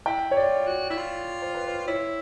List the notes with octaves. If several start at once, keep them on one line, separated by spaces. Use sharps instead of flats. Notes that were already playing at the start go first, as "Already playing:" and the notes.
E4 G5
C#5
F4 D5
F#4
E4
F4
C5
B4
C5
E4 C#5